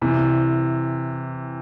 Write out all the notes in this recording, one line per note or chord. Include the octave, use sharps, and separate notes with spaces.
C3 E3